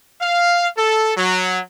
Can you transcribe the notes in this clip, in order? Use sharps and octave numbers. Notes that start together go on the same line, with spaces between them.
F5
A4
F#3